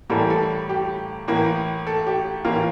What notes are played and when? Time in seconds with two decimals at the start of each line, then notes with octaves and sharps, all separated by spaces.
0.10 A2 E3 G3 A#3 A4
0.30 A4
0.69 G4
1.28 A2 E3 A#3
1.87 A4
2.06 G4
2.45 A2 E3 A#3 F4